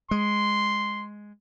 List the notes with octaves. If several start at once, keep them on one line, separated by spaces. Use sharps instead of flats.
G#3 C6